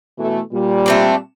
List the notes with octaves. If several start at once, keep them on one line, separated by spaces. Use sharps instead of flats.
B2 E3 A3
A#2 G3
A3 C4 D4